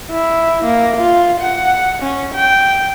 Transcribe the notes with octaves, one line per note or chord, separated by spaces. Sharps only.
E4
A#3
F4
F#5
C#4
G5